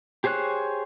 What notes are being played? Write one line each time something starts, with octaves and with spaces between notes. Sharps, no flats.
G4 G#4 C5 C#5 F#6